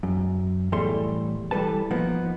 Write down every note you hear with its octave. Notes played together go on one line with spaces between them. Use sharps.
F#2
E2 A2 G3 A4 E5 C6
E3 G3 A4 B4 A5
F3 A#3 B3 D#4